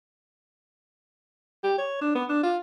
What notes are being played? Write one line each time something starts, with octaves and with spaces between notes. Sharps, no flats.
G4
C#5
D4
B3
D4
F4